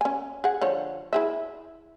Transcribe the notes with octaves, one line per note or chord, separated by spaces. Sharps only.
C#4 G#5
G#4 F#5
D3 F3 C#5
E4 G#4 E5